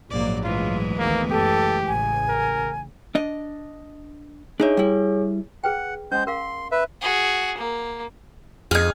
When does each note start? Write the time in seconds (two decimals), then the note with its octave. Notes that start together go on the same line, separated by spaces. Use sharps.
0.10 A#1 G#2 F#3 A#3 D5
0.44 E3 G#3 A3 F4
0.98 G#1 D2 A#3 B3
1.30 F#1 G4 A4
1.87 A1 C#3 G#5
2.29 A#4
3.15 D4 D#5
4.60 D4 D#4 G#4 C#5 E5
4.77 G3 E4
5.64 G#4 B4 F#5 G5
6.12 G#3 C#4 C5 G6
6.27 A#4 F5 C6 D6
6.72 B4 E5
7.01 F#4 G#4
7.57 A#3
8.71 F2 D#4 G#4 F6 G#6